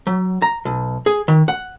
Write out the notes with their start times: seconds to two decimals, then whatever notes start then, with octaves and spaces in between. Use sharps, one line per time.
0.07 F#3
0.42 A#5
0.65 B1
1.06 G#4
1.28 D#3
1.48 F#5